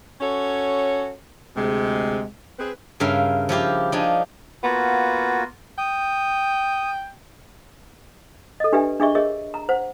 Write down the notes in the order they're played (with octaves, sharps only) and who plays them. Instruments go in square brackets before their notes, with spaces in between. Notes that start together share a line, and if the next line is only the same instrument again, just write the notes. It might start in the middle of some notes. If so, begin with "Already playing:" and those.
[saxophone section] C#4 F#4 A4 C#5
D2 C3 G#3
C4 G#4 B4
[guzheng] G2 C#3 A#4 E5 F5
F3 E4 G4 F5
F3 D4 D#4 G#5
[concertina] A#3 F4 F#4 [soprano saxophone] B3
[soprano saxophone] G5 [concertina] D#6
[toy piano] A4 D#5
D4 G4 B4 D5 E5 G#5
D4 G#4 D#5 E5 C#6
G#4 A#4 C#5 D#5 E5
A#5
C5 F#5